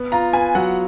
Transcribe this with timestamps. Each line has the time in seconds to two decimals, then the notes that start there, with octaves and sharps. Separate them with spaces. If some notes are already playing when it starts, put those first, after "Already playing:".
Already playing: B3
0.12 F4 A#5
0.33 B4 G#5
0.55 F#3 F#5